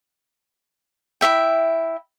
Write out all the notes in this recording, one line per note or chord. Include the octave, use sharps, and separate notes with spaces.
E4 F#4 E5 G5